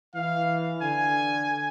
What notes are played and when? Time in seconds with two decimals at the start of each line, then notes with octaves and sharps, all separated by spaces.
0.15 E3 F5
0.81 D3 G#5